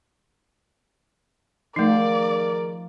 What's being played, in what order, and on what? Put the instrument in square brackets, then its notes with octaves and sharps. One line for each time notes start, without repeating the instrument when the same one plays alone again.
[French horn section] D#3 G#4 A#4 [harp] F3 [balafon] A3 D#4 [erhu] D5